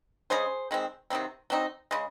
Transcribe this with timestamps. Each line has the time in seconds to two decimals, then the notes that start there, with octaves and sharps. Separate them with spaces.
0.30 C#3 G#3 C#4 G#4 C5
0.71 D#3 G#3 C4
1.10 C3 D#3 F#3 C4
1.50 F#3 C4 D#4
1.91 C#3 G#3